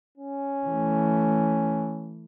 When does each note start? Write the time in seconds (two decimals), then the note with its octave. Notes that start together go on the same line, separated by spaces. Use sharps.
0.18 C#4
0.68 E3 A3